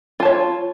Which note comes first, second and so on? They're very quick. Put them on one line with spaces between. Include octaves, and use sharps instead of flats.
F4 A5 C#5